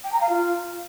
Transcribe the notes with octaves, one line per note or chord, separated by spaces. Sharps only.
G5
A#5
F5
F4